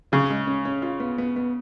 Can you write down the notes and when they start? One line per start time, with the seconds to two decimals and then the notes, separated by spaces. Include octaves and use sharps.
0.12 C#3 C#4
0.30 G#3
0.47 C#4
0.65 C#4
0.82 F4
1.00 B3
1.18 B3
1.36 B3